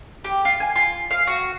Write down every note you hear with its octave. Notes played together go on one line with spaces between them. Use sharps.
G4
F4
G#5
F4
F5
F#4